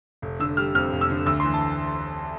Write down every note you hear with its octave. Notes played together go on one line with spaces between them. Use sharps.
F1
D3 E6
G3 F6
F2 F6
F1
E6
D3
D2 E6
E3 C6
A5